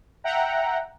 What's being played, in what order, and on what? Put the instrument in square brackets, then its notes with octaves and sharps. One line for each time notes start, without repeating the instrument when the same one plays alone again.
[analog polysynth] E5 F#5 G5 A#5